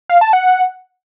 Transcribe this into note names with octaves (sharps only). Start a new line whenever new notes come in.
F5
A5
F#5